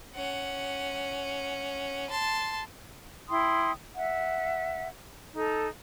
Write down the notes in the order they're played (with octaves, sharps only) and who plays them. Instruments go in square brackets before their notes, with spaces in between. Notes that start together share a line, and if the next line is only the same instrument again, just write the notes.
[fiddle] C#4 F#5
A5 C6
[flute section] E4 G5 C6 D#6
E5 F#5
D#4 A4